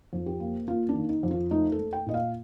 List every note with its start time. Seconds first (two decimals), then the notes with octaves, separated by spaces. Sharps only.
0.13 F2
0.26 G4
0.40 A#3
0.68 A#3 F4
0.89 D4
0.95 D#3
1.09 D#4
1.23 F2
1.31 F4
1.51 A3 D#4
1.72 A4
1.79 A3
1.93 G5
2.06 A#2 D#5
2.14 F5